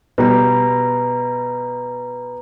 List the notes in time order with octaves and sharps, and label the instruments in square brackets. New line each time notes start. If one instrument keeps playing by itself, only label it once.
[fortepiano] B2 G3 [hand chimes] B4 A#5